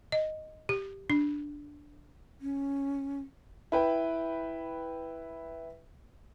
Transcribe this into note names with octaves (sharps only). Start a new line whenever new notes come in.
D#5
G4
D4
C#4
E4 B4 G5